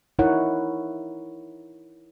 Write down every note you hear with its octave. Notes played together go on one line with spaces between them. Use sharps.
D#4 E4 A#4 C#5 F#5